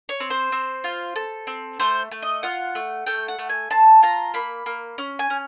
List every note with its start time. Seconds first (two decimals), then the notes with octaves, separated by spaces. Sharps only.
0.09 C#5
0.20 C4
0.30 C5
0.52 C4
0.84 F4
1.16 A4
1.47 C4
1.80 A3 C5
2.11 A3
2.22 D#5
2.43 F4 F#5
2.75 A3
3.06 A3 G5
3.28 F#5
3.39 A3
3.49 G#5
3.70 C4 A5
4.03 F4 A#5
4.34 A#3 B5
4.66 A#3
4.98 C#4
5.19 G#5
5.30 C#4